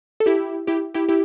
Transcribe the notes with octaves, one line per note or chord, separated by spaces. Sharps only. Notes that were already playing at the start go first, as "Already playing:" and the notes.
A4
E4 G4
E4 G4
E4 G4
E4 G4